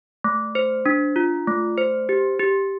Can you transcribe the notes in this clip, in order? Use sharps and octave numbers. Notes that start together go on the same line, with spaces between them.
A3
C5
D4
F4
A3
C5
G4
G4